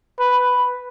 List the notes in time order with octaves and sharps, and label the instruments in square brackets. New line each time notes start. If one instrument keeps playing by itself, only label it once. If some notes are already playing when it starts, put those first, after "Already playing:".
[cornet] B4